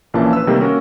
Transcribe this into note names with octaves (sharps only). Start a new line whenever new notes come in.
A#1 A#2 E3 A#3 C#4 A5
B4 E6
C3 D#3 G3 A3 A#3 C4
A#3 C#4 F#4 A#4